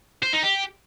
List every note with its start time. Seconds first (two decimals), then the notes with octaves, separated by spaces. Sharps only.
0.23 C5
0.33 D#4
0.43 G4